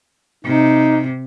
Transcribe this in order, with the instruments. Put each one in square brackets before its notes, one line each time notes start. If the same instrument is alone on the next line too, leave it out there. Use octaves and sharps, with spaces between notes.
[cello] C3 [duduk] D#4